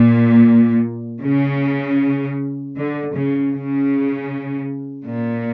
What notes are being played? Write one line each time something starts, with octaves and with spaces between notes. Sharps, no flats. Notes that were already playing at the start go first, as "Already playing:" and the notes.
Already playing: A#2
C#3
D3
C#3
C#3
A#2